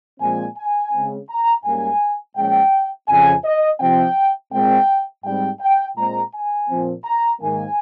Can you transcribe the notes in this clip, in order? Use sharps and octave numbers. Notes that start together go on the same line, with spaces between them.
A#2 F3 G#3 C4 G#5
G#5
C#3 G#3 C4
A#5
G#2 G3 A#3 C#4 G#5
A#2 F3 G#3 C#4 G5
F2 C#3 F3 G#5
D#5
C3 F3 C4 G5
A#2 G#3 C4 G5
G#2 G3 C4 G5
G5
A#2 G#3 C4 A#5
G#5
A#2 F3 C4
A#5
G#2 D#3 A#3 G#5